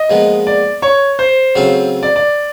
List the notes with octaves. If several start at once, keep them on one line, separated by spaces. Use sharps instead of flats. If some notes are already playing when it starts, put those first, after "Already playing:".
Already playing: D#5
A#2 F3 G#3 B3
D5
C#5
C5
C#3 F#3 A3 C4 F4
D5
D5